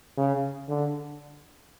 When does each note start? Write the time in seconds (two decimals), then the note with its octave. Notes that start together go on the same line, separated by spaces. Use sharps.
0.17 C#3
0.69 D3